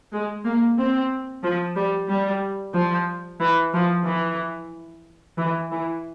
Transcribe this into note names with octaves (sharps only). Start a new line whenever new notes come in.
G#3
A#3
C4
F3
G3
G3
F3
E3
F3
E3
E3
E3